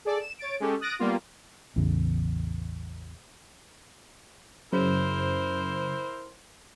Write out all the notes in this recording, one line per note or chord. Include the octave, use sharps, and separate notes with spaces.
G#4 A4 D5
E7
C#5 A6 D7
G#3 C#4 G4 A4
D#6 F#6 A6 A#6 D7 D#7
G3 A#3 B3 F4
A1 E2 C#3
F#2 C#3 E4 A#4 C5